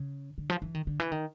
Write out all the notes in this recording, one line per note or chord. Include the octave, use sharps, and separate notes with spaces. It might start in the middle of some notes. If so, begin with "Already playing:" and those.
Already playing: C#3
D3
F3
E3
D#3
D3
E3
D#3